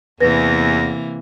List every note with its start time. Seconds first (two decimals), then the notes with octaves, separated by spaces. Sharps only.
0.20 E2 C3 E3 A#3 B4 A#6